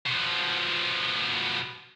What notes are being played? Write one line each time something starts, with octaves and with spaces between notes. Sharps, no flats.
B2 F3